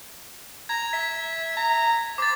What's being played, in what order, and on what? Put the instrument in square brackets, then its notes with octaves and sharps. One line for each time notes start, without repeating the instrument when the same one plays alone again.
[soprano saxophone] A#5 [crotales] G#6
[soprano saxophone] E5 [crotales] B6
[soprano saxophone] A#5
[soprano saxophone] C5 [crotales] D6 A6